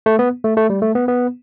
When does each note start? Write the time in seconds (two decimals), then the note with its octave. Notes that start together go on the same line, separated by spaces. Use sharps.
0.06 A3
0.19 B3
0.44 A3
0.57 A3
0.70 G3
0.82 A3
0.95 B3
1.08 B3